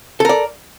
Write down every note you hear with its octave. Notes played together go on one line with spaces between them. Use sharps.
A4 A#4 D5